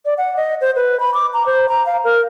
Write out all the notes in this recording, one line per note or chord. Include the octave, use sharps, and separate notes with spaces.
D5
F#5
D#5
C5
B4
B5
D6
A#5
C5
A#5
F5
A#4